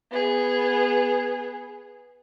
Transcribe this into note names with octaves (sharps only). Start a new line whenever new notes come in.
B3 G#4